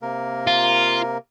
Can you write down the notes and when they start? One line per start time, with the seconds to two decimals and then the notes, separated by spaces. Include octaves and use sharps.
0.02 C3 A#3 A#4
0.47 F4